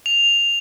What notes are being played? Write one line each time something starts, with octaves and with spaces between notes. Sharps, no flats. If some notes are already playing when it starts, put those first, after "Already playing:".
F7